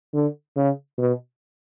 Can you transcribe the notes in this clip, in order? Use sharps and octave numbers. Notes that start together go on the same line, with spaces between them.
D3
C#3
B2